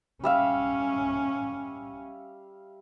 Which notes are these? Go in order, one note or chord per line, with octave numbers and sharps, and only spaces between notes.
G3 C#4 E5 F5